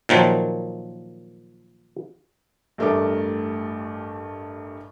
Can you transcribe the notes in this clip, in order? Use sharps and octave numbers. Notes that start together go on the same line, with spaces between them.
A#2 D#3 F3 F#3
A1 G2 A3 A#4 D5 D6